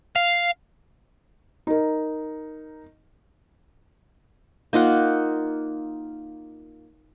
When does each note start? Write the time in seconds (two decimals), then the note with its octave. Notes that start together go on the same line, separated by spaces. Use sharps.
0.16 F5
1.67 D#4 A#4
4.73 A#3 D#4 F4 F#5